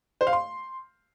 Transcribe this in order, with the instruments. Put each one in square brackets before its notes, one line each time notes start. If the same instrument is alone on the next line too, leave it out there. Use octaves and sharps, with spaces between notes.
[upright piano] C5
F5
C6